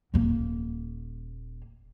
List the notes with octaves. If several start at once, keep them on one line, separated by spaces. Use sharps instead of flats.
D#1 A#3